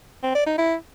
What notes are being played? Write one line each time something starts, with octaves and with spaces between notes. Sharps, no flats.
C4
D5
D#4
E4